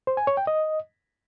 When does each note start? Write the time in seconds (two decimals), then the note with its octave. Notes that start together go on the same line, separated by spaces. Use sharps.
0.07 C5
0.17 G#5
0.27 C#5
0.37 G5
0.47 D#5